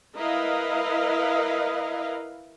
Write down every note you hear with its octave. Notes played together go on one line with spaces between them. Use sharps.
E4 A#4 B4 D#5 F5